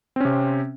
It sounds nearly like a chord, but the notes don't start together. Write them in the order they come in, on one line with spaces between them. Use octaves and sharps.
C4 C#4 C3